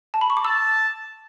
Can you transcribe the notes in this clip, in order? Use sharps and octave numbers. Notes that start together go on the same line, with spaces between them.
A5
B5
C#6
D6
A5 E6